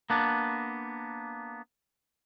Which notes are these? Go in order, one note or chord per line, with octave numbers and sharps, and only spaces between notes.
A#3 B3 D4